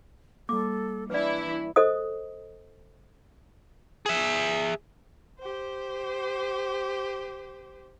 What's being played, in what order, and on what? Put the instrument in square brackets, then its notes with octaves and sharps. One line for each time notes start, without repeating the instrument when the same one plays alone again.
[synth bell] G3 A#3 [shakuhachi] A4 [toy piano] D6
[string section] E3 E4 [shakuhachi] D4 [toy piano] B4 D5
[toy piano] A4 C5 D#5 D#6
[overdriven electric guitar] G#4 E5
[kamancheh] G4 C5